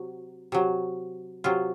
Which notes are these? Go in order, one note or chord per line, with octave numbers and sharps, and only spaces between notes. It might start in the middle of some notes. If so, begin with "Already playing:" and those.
Already playing: C3 F#3
C3 F#3
C3 F#3 F4